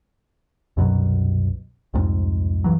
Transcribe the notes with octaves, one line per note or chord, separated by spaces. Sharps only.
C2 F#2 B2 F#3
C2 F2 G#2
G2 E3 F#3